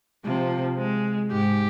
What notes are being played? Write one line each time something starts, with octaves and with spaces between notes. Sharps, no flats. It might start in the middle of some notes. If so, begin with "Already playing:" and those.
C3 F3
G#3
G#2 G4